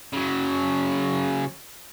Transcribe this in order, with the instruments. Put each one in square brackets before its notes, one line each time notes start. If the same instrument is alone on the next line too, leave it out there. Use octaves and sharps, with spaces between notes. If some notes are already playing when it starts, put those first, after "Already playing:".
[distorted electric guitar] C#3 F#3